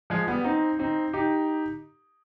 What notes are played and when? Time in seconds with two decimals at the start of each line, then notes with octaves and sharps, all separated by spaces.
0.10 F3 G#3
0.27 G3 B3
0.44 C4 D#4
0.79 C4 D#4
1.13 D#4 G4